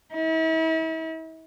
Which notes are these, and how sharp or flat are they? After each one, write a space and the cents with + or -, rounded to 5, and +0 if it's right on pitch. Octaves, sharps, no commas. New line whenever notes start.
E4 -40